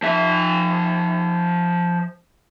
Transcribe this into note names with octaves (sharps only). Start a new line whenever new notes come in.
F3 E5